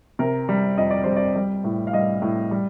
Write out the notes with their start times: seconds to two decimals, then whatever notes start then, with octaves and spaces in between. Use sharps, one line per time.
0.19 C3 A#4
0.49 G3
0.78 F2 D#5
0.91 D5
1.04 G3 C5
1.16 D5
1.36 G3
1.64 A2
1.87 F5
1.93 G3 D#5
2.22 A2
2.51 G3